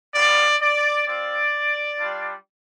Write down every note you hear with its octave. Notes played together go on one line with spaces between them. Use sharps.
G3 B3 F4 D5
D5
C4 F4 D5
G3 D4 F4